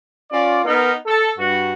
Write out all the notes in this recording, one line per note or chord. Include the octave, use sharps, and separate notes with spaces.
C#4 F4 D5
B3 D#4 A#4
A4
G2 F#4